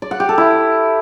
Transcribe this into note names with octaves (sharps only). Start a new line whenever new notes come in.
D5
F#5
G4
A4
E4